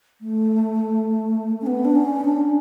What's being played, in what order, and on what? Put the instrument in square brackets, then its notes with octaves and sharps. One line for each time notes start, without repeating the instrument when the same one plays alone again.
[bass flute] A3
C#4
B3
D4
C#4
D4